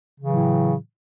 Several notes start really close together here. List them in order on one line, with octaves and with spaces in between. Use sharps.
C#3 E3 F#3 A2